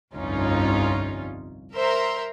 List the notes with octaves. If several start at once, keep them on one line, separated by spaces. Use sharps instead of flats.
G1 C2 F2 C#4 D#4 F4
A#4 C5 E5 A#5 C6